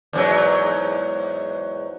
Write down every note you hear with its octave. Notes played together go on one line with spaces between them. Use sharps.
E2 G#2 F#3